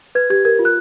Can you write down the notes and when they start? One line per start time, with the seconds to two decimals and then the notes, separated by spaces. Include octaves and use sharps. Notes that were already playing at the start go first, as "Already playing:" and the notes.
0.15 B4 G#6
0.30 G4 G#6
0.45 A#4 G#6
0.59 F4
0.65 F#6